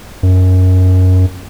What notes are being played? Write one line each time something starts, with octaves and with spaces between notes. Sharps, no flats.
F#2